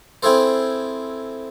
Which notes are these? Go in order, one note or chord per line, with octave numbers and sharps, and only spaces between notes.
C4 E4 G#4 A4 C5